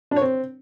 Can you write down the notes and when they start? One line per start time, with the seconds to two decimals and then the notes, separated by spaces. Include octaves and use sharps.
0.11 D4
0.16 C#5
0.22 C4